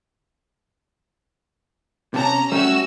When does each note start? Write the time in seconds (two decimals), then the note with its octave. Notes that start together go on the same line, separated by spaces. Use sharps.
2.14 C3 C#4 A5 A#5
2.52 G3 A3 C#4 F#4 E6